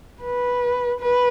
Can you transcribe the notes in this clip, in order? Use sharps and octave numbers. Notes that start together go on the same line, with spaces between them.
B4
B4